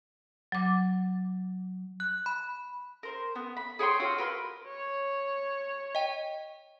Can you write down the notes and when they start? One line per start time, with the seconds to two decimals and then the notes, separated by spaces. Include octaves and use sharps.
0.52 F#3 D6
2.00 F#6
2.26 B5
3.03 A#4 C5
3.36 B3
3.57 B5
3.79 G#4 C#5 G5 C6
3.99 F4 F#4 C6 E6
4.18 A#4 B4 C6
4.68 C#5
5.95 D#5 G5